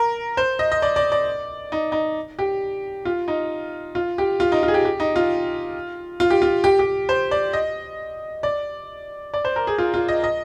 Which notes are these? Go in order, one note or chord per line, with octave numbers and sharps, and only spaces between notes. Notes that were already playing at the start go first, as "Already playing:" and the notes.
Already playing: A#4
C5
D#5
D#5
D5
D5
D5
D#4
D#4
G4
F4
D#4
F4
G4
F4
D#4
F4
G#4
G4
G4
D#4
F4
F4
G4
F4
G4
G4
C5
D5
D#5
D5
D5
C5
A#4
G#4
F4
F4
D#5
D#5